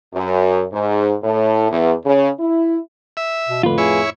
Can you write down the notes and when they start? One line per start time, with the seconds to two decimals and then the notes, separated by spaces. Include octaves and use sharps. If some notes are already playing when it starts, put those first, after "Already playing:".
0.14 F#2
0.73 G#2
1.24 A2
1.71 E2
2.05 C#3
2.40 E4
3.17 E5
3.48 B2
3.63 F2 A2 D3 F4 B4
3.78 E4 G#4 C#5